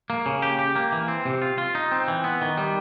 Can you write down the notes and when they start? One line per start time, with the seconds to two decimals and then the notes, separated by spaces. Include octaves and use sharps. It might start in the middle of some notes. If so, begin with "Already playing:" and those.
0.10 A#3
0.26 C#3
0.42 G4
0.59 G4
0.76 A#3
0.92 E3
1.08 C4
1.25 C3
1.42 F4
1.58 F4
1.75 D#4
1.92 C4
2.08 E3
2.24 B3
2.42 D#3
2.57 G3